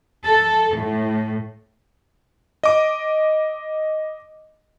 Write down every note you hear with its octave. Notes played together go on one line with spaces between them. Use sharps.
A4
A2
D#5 D6